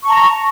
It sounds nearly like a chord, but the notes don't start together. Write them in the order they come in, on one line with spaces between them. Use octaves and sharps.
C#6 A5 A#5